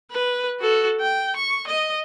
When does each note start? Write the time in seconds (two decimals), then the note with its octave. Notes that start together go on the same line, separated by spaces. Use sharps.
0.11 B4
0.60 F#4 A4
1.01 G5
1.36 C#6
1.67 D#5